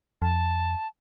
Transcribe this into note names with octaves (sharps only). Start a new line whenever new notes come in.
F2 A5